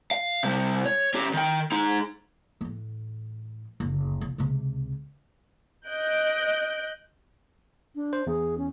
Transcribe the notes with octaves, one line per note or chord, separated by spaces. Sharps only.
F5
C3 G3
C#5
C#4 G4
D#3 G5
D#4 G#4
A2 E3
F#1 D2
C2
C#2 C3
D#5 F#6 G6 D7
D4
C5
E2 G#4
C#4